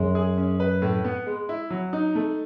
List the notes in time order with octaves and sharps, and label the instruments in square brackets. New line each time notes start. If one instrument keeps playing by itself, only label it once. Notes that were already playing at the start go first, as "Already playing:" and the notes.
Already playing: [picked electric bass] F#2 [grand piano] G#3
[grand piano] G#4
C#4
B4
A2
B3
G#3
E4
F#3
D#4
A3